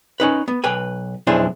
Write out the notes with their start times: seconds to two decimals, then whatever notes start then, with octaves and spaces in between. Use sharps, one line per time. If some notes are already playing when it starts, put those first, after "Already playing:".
0.20 C#4 D#4 B4
0.48 B3
0.64 B1 B4 G5 G#5
1.27 B1 F2 D4 E4 G#4 C5